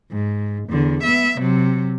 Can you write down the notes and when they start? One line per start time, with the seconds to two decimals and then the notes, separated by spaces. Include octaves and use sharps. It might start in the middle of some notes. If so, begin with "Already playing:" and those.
0.11 G#2
0.69 E2 D3
1.03 B3 E5
1.38 C3 F#3